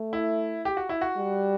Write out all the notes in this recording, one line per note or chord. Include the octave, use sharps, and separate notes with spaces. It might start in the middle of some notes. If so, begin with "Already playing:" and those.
Already playing: A3
E4
G4
F#4
E4
F#4
G3